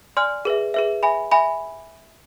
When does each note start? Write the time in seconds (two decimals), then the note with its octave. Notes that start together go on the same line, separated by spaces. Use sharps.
0.17 D5 G#5 C6 F6
0.45 G#4 B4 E5
0.74 G#4 B4 E5
1.03 E5 G#5 B5
1.31 E5 G#5 B5